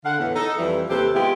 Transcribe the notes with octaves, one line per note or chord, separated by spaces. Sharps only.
D3 F5 F#5
E2 A2 E3
D#4 A4
F2 E3 G3
D#2 C3 G4 A4 B4 C5
G#3 B3 E4 F4 G4 G#4